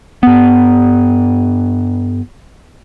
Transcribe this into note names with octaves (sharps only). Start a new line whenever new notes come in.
G2 B3